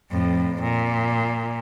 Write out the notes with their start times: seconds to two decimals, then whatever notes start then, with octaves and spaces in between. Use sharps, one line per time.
0.11 F2 A2
0.61 A#2